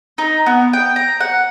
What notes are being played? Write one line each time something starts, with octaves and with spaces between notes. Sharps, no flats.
D#4
B3
G5
A#5
F#5